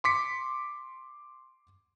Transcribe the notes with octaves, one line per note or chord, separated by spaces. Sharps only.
C6 D6 B6 C#7